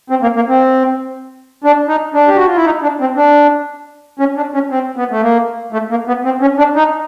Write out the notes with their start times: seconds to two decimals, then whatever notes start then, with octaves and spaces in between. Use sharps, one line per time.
0.10 C4
0.22 A#3
0.36 A#3
0.48 C4
1.64 D4
1.89 D#4
2.14 D4
2.28 G4
2.36 F#4
2.47 F4
2.56 E4
2.65 D#4
2.82 D4
3.00 C4
3.17 D4
4.19 C#4
4.36 D4
4.54 C#4
4.71 C4
4.97 B3
5.11 A3
5.22 A#3
5.73 A3
5.90 A#3
6.07 B3
6.25 C4
6.41 C#4
6.58 D4
6.76 D#4